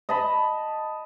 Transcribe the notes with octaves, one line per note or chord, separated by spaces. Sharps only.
D#5 A5 B5